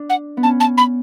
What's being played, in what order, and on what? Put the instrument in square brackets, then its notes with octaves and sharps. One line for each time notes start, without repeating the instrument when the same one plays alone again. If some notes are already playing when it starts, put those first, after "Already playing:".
Already playing: [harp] D4
[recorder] F#5
[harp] B3
[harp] C#4 [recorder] A5
[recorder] A5
B5